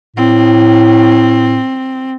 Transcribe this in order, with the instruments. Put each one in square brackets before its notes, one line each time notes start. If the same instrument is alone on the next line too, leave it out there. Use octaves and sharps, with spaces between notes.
[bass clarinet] A2 [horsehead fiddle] C4